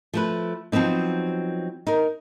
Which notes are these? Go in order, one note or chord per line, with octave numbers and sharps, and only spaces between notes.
F3 A3 B4
F3 F#3 B3 C4 D#4
D#4 A#4